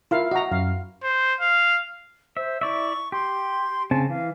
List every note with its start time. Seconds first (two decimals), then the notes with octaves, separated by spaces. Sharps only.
0.11 E4 F4 A#4 F5
0.31 F#4 D#5 A#5
0.52 F#2 F5
1.03 C5
1.41 F5
2.37 C5 E5
2.61 E4 D5 E5 C#6
3.12 G4 C6
3.91 C#3 C4 G#5 A5
4.09 E3 F5